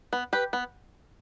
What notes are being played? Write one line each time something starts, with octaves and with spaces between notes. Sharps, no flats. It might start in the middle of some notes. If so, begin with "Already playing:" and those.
B3
G4 B4
B3